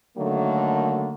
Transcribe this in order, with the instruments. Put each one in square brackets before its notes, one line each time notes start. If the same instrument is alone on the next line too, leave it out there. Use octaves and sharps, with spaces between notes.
[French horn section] D3 D#3 F#3 A3 A#3